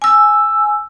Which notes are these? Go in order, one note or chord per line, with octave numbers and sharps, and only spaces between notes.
G#5 E6